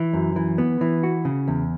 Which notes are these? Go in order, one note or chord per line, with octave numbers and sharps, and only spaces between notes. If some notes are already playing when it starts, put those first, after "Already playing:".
Already playing: E3
F#2
E3
B3
E3
F#4
C#3
E2